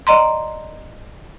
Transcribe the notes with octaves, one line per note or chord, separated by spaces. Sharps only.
D5 D#5 A#5 C6